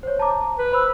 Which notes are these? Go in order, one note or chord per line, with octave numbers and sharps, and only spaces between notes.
C5 C#5
A5 A#5 D6
B4
C5 B5 E6